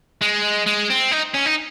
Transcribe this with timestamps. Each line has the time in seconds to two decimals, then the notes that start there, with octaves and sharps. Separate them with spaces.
0.21 G#3
0.66 G#3
0.90 C4
1.12 D#4
1.34 C#4
1.46 D#4